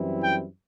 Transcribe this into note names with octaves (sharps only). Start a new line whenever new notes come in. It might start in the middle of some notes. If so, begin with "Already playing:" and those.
Already playing: F#2 E3 G3 C4 E4
G5